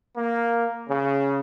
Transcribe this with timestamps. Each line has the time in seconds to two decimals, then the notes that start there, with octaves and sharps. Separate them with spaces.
0.17 A#3
0.89 C#3